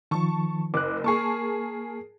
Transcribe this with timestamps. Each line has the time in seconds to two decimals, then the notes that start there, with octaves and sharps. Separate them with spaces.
0.11 D#3 F3 A5 C#6
0.74 F#1 D6 F#6
1.04 A#3 G#4 A#4 A5 C#6